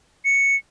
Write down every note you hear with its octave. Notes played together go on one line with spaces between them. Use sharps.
C#7